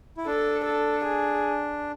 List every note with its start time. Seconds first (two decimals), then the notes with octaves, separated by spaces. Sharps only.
0.17 E4
0.26 D4 A4
0.65 A4
1.05 G#4